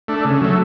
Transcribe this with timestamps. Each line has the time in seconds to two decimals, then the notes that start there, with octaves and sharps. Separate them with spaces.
0.08 A3 D4
0.25 C#3
0.41 F#3 A3